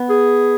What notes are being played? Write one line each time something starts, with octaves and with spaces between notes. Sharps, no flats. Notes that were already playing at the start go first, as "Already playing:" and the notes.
Already playing: B3
G#4